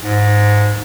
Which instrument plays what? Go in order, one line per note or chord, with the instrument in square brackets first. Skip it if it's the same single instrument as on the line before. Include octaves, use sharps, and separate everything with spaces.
[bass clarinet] G#2